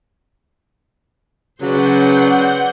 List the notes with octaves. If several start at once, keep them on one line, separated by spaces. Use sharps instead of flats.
C#3 F#3 B4 C5 D5 F#5 G6